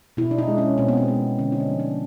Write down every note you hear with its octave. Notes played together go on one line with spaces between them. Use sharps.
B2 E4
D4
D#4
G#3
C#4
B2 C4
B3
C4
G#3 B3
D3 C#4
D#4
D4
F3 A3
D4